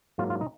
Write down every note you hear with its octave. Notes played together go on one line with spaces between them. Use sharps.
G#2 F#3 A#3 F4
F4
D#4